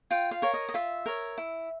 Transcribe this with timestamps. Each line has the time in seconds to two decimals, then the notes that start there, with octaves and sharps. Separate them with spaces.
0.11 F4 G5
0.31 F5
0.42 A#4 C#5
0.54 D#5
0.69 D#5
0.74 F4 E5
1.06 A#4 C#5
1.38 E4